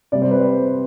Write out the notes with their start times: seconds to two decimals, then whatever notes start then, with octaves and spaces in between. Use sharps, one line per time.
0.12 C3 G3 D5
0.22 C5
0.31 B4
0.41 C5